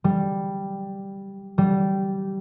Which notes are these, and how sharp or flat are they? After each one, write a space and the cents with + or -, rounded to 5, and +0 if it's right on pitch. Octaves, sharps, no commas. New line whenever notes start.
G3 +0
G3 -15